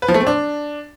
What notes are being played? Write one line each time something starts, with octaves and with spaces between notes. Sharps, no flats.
B4
F3
A3
C4
D4